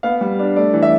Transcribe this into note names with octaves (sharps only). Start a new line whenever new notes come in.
B3 F5
G3
D4
A3 D5
E3
E5